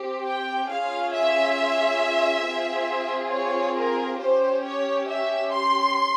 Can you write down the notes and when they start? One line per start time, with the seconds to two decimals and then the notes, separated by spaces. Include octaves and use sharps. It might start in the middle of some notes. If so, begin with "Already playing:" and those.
Already playing: C4 G4
0.26 G5
0.69 C#4 F4 G#4 F5
1.13 E5
2.45 C4 F4 G#4
3.32 C#5
3.77 A#4
4.19 C#4 G4 C5
4.64 C#5
5.08 E5
5.52 C6